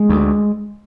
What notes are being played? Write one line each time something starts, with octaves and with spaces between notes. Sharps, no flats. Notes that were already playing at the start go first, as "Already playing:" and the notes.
Already playing: G#3
D2